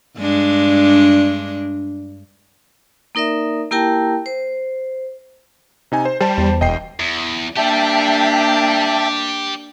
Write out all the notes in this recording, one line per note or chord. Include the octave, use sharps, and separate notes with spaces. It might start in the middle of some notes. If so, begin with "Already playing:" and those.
G2 G#3 D4
A#3 D#4 A#4 D5 E5
A#3 E4 G4 A#4 G5 A5
C5
C3 D#4 G#5
C5
G3 C5 A5
E2
E1 D#5 G5 C7
E2
A#3 D4 G4 D5 E5 G5 A5